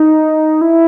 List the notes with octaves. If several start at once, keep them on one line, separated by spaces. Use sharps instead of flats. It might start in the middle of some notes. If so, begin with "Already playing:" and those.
Already playing: D#4
E4